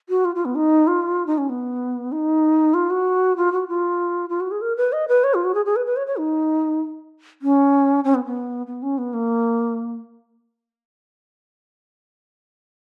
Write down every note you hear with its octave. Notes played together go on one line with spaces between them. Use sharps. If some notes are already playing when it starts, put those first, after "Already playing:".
F#4
F4
F4
B3
D#4
F4
D#4
C#4
B3
D#4
F4
F#4
F4
F#4
F4
F4
F#4
G#4
A#4
B4
D#5
B4
C#5
F4
F#4
G#4
G#4
B4
B4
C#5
C#5
D#4
C#4
C#4
B3
B3
B3
C#4
B3
A#3